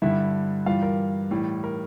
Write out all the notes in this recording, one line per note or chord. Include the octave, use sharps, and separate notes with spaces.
G2 D3 G3 E4 E5
G2 E3 G3 F4 F5
A#4
A2 E3 G3
A#4